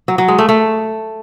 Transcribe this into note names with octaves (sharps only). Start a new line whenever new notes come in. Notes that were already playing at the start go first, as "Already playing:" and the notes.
F#3
F#3
G#3
A3
A3